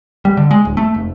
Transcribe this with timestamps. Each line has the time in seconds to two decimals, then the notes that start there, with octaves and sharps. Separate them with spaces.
0.25 G3
0.37 D3
0.51 G#3
0.65 D1
0.77 A3
0.94 F1